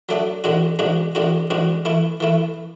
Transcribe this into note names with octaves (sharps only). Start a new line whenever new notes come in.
F#3 A3 D4 A4
A1 G#2 G#3 D4 F#4
A1 G#2 G#3 D4 F#4
A1 G#2 G#3 D4 F#4
A1 G#2 G#3 D4 F#4
E3 A3 E4
E3 A3 E4